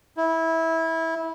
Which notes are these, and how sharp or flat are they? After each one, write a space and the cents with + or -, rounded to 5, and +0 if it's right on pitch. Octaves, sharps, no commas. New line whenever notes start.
E4 -20